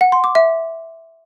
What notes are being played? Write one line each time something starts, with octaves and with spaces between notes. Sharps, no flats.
F#5
C6
D6
E5